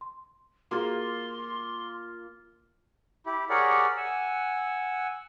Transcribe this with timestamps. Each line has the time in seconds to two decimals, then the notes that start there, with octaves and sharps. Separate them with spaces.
0.01 C6
0.71 A#3 F4 F#4 G#4 C6
3.26 E4 G4
3.50 G4 G#4 A#4 C#5 D5 F#5
3.97 F#5 G#5 E6